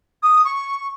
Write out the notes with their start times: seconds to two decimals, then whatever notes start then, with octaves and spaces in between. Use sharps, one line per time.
0.22 D#6
0.44 C#6